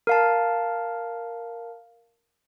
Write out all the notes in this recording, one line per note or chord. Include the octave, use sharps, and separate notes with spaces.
A#4 F5 A5